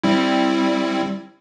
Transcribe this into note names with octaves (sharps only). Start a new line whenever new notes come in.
G3 C4 E4